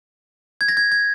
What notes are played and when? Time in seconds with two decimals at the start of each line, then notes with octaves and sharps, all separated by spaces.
0.61 G#6
0.68 A#6
0.77 G#6
0.92 G#6